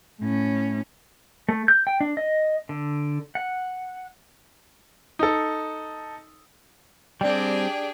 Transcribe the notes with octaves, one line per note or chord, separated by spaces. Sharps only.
A2 C#4
A3
G6
G5
D4
D#5
D3
F#5
D#4 A4
G3 C4 D4 G4 G#4 D5 G5